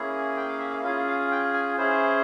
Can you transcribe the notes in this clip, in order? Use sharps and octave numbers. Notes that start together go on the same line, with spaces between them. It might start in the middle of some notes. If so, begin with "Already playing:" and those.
Already playing: A#3 C#4 E4 G#4
G5
F5
E5
F5
C#4 F4 G#4 F5
F5
G5
G#5
C#4 E4 G#4 C5